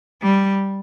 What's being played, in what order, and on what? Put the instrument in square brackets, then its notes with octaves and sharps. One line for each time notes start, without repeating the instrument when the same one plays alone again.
[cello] G3